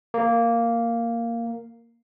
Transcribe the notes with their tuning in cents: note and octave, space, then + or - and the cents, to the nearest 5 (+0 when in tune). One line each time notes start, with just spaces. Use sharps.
A#3 -5